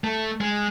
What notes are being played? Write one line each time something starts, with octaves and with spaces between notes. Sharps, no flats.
A3
G#3